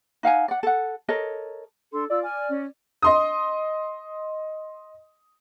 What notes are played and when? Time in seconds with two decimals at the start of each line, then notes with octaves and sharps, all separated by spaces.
0.23 D#4 F5 F#5 G#5
0.48 D5 F#5
0.63 A4 F#5
1.09 A4 A#4 C#5 D#5
1.92 D4 A4 C6
2.10 F4 D5 E6
2.23 G#5 F6
2.49 C#4
3.02 D#5 C6 D#6